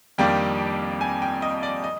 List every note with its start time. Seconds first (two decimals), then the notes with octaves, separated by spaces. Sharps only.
0.18 F2 D#3 G3 A#3 D4 G5
1.01 G#5
1.22 G5
1.42 D#5
1.63 D5
1.84 D#5